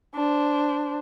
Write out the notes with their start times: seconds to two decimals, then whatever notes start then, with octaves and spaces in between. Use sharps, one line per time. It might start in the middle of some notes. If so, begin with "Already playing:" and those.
0.15 D4 C5